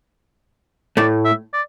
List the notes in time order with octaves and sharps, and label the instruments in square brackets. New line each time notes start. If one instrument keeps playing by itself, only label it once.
[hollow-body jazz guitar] A2 A3 [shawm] D5
[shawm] E5
D5